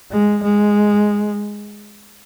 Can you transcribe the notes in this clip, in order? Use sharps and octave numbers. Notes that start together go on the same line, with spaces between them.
G#3
G#3